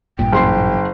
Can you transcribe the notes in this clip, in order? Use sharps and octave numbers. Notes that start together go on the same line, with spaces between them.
A1 G2 A#2 G5
F#1 C6 C7